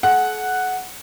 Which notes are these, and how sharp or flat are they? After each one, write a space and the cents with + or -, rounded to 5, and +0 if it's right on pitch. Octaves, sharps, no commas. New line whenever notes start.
A4 -45 F#5 +0